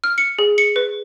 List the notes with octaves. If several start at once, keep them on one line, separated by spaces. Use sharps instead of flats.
F6
C#7
G#4
C#7
B4